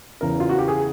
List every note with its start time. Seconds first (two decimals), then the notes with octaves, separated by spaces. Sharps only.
0.21 E2 C#3 E3 A#4
0.40 F4
0.49 F#4
0.58 G4
0.68 G#4